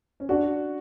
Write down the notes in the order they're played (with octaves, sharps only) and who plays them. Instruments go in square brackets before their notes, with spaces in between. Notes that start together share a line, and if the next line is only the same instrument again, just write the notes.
[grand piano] C#4
[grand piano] D4 [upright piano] F#4